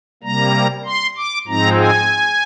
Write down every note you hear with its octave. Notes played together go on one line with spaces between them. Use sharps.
C3 G3 A#3 A#5
C6
D6
G#2 F3 G#3 C4 D#4 A#5
G#5